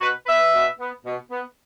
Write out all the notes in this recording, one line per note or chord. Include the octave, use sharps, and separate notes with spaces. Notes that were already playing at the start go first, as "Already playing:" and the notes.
B2 F#4 B4
B3 B4 E5
B2
B3
B2
B3